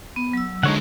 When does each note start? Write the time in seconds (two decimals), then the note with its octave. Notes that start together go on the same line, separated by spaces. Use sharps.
0.16 B3
0.33 F#3 E6
0.63 D3 G#3 D#4 C#5 F#5